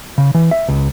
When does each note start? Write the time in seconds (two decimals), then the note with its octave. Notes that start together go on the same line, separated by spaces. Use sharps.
0.18 C#3
0.34 E3
0.51 E5
0.68 C#2